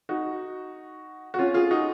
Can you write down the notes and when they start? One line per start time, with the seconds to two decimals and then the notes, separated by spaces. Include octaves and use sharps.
0.09 D#4 F#4
1.34 F#4
1.39 C#4 F4
1.54 F4 G#4
1.71 D#4 F#4